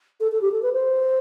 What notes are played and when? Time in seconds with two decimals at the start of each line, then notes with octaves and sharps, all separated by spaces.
0.20 A4
0.32 A4
0.41 G4
0.52 A4
0.62 B4
0.73 C5